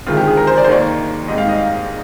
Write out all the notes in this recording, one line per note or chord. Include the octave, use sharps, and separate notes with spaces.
D2 C3 D#3 G#3 C4 F4
G4
G#4
A#4
C5
D5
C5
D#2 D#3 A#3 D5
G#2 G3 C4 D#5
F5
D#5
F5